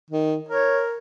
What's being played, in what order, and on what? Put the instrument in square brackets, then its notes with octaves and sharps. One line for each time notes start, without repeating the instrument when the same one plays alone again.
[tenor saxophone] D#3
[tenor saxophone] A#4 [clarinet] C#5